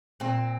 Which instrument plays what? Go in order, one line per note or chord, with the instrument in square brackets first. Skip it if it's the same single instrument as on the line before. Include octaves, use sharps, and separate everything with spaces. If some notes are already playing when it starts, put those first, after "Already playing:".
[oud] A#2 [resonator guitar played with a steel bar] C4